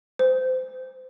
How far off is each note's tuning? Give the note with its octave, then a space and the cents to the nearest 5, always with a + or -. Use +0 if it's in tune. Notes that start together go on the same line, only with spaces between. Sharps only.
C5 -20